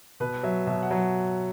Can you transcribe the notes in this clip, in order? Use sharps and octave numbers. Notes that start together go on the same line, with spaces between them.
B2 B4
F#3 E5
B2 E5
F#5
F#3